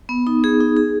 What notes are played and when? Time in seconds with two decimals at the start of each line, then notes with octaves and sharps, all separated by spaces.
0.09 B3
0.27 D#4
0.44 G#4
0.60 D#4
0.77 G#4